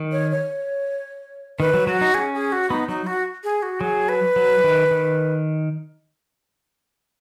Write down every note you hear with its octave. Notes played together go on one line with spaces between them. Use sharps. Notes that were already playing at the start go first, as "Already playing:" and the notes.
Already playing: D#3
C#5
C#5
D#3 B4
F#3
F#3 F#4
D#4
C#4 G#4
G#4
F#4
B3 D#4
F#3 D#4
F#4
G#4
F#4
F#3 G#4
B4
F#3
D#3
D#3